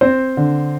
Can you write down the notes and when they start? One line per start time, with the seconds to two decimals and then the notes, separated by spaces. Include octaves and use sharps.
0.01 C4 C5
0.37 D3